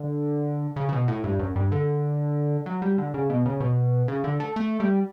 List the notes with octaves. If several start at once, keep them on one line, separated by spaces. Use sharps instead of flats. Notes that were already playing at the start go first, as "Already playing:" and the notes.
Already playing: D3
C#3
C#3
B2
A2
G2
F#2
G2
D3
F#3
G3
D3
C#3
B2
C#3
B2
C#3
D3
A3
A3
G3